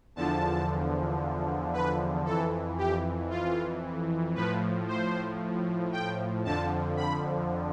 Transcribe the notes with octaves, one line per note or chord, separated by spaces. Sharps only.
E2 D3 F3 A5
B4
F2 E3 A4
G4
F4
A2 F3 B4
C5
G5
F2 D3 F3 A5
B5